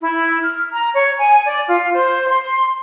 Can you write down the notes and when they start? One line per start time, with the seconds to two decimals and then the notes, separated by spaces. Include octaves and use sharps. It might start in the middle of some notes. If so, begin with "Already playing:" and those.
0.01 E4
0.41 F6
0.72 A#5
0.93 C#5
1.18 G#5
1.45 D5
1.68 F4
1.93 C5
2.29 C6